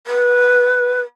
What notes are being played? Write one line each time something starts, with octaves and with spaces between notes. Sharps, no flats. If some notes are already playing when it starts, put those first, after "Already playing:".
B4